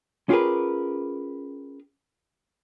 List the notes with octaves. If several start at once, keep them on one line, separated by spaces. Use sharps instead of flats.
C#4 F4 G4 G#4 A#4 B4